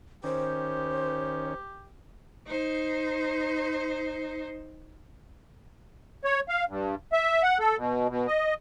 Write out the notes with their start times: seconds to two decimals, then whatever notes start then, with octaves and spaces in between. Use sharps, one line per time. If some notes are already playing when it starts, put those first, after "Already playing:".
0.24 D#3 C#4 G4 C5
2.46 D#4 C5
6.25 C#5
6.49 F5
6.69 G2
7.13 E5
7.43 F#5
7.59 A4
7.77 B2
8.09 B2
8.27 D#5